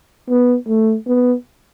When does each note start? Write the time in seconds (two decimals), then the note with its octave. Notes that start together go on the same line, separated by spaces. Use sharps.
0.29 B3
0.68 A3
1.07 B3